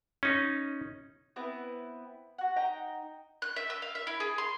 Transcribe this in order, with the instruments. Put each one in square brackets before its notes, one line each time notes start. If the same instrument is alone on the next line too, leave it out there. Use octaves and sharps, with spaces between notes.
[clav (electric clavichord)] C#4 D#4
[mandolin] B3 C4 E4 B4
F#4 F#5
D#4 G5 A#5
F#6
E5
E6
F5
E5
E4
G#4
C6